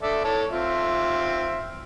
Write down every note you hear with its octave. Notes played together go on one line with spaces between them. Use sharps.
A4 D5 E5
A4 C#5 A5
C4 F4 E5